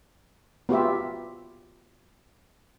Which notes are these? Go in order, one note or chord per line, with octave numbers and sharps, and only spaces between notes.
B3 F4 G4 E5